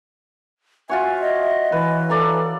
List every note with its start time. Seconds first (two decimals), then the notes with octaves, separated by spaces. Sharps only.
0.90 F4 F#4 C#5 E5 G#5
1.21 D#5
1.72 E3 B4
2.10 A4 D5 A#5